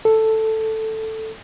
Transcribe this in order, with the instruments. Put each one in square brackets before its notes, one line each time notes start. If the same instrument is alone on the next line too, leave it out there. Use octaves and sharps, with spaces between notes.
[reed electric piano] A4